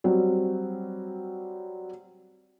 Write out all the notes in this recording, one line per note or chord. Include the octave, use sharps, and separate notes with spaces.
F#3 G3 C4